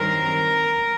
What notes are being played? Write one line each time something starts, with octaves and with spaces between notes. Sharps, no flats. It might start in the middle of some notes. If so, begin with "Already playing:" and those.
Already playing: G2 D#3 F#3 C4 A#4